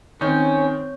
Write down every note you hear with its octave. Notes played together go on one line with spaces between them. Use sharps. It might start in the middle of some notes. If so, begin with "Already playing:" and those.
D#3 C4 C#4 C#5 G6